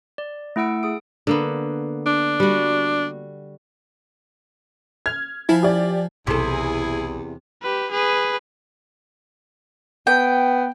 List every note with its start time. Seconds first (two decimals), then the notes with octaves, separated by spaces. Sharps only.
0.18 D5
0.56 A3 E4 F#5 E6 D7
0.83 G#4 D#6 D7
1.27 D3 A#3 B3
2.06 D4
2.40 G3 F#4
5.06 F6 G#6
5.49 F3 E4 F5 G#5
5.63 G4 D5
6.27 B1 E2 C3 E4 G#4 A4
7.62 G4 B4
7.91 G#4 B4
10.07 B3 G5